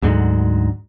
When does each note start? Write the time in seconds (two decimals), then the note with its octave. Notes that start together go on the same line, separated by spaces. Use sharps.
0.02 D2 G#2 D3 F#3